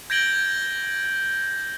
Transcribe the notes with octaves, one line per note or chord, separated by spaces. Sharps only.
G6 G#6 A#6 D7 F#7 G7